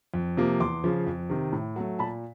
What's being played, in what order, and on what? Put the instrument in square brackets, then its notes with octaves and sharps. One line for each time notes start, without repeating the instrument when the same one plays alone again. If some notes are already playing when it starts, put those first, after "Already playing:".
[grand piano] F2
C3 F3 A#3
E2 C6 D6
C#3 F3
F2
C3 D#3
A2
F#3 A3
A#2 A5 B5